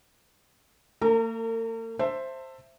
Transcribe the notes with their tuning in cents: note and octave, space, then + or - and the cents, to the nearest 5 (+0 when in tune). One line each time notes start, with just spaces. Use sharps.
A#3 -45 A#4 -40 A#5 +0
C5 +5 E5 +10 A5 +30